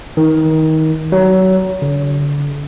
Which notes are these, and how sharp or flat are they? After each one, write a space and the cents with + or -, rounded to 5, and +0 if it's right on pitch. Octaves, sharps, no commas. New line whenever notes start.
D#3 +25
F#3 +25
D3 -35